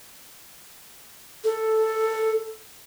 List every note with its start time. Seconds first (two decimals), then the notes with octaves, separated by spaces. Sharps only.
1.44 A4